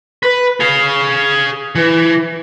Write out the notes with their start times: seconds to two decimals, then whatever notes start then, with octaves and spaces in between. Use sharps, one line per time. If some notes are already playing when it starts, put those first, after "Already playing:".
0.23 B4
0.60 G#4 F5
1.75 E3